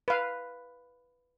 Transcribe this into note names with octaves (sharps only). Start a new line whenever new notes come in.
B4 F5